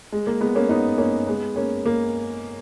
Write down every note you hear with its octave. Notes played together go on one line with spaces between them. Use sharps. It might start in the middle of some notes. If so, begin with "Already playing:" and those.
G#3
A#3
G#3 B3
A#3 C#4
B3 D#4
A#3 C#4
G#3 B3
A#3 C#4
A#3